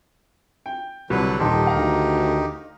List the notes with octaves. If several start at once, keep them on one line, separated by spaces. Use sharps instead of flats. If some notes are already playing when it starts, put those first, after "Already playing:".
G5
C2 D3 F#3 B4
D#1 D#3 D#4 G4 A4 C6
D2 F5 A#5